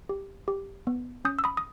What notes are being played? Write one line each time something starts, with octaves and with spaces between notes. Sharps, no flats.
G4
G4
B3
C#4 D#6 G6
E6
B5 D#6
D#6